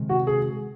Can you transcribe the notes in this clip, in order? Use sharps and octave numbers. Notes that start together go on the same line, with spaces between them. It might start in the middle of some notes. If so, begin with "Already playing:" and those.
Already playing: C3 D#3 G#3
F#4
G#4